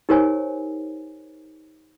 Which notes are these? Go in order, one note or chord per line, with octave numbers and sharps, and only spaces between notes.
D#4 G4 A#4 C5 C#5 G#5